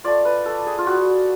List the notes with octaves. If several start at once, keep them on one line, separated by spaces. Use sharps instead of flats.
A3 F4 D5
B4
A4
G#4
F4
F#4